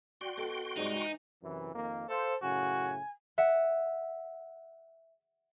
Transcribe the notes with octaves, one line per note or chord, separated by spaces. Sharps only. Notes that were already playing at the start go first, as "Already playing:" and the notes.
F#4 D5 G5 C6
B2 A4
G#2 C3 G3 D#4
E3
F#2 C3 E3
F2 D#3 A#3
A4 C5 F5
F#2 A2 C#3 F#4 G#5
E5 F#5